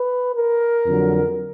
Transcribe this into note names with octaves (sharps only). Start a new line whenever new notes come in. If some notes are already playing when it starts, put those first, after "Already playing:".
Already playing: B4
A#4
F2 D3 F#3